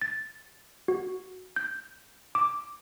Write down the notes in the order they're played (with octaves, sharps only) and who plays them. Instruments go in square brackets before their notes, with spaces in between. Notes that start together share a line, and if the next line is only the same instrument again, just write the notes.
[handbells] A6
F#4
G6
D6